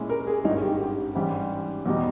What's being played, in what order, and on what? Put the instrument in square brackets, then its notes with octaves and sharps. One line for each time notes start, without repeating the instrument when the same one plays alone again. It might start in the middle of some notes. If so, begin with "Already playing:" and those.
Already playing: [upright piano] A#2 G#3 C#4 E4
[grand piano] A#4
G#4
[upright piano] G#1 G2 D#3 G#3 C#4 [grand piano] D#4
[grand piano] G4
G4
[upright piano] G#2 E3 G3 C#4 [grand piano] G4
[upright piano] E2 B2 G3 B3 D#4